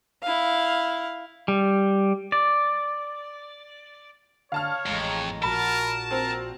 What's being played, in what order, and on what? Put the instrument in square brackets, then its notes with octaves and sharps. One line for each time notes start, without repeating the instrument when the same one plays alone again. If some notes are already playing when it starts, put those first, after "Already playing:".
[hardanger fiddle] E4 F5
[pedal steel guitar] G3
D5
[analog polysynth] D3 [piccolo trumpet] C#5 [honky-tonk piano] F5 A5 F6
[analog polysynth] A1 G#3 A#5 [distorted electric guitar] F2
[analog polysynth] A#1 A#2 F#4 [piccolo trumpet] A#4 [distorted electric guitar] A5 [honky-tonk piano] B5
[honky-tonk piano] C4 [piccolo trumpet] A#4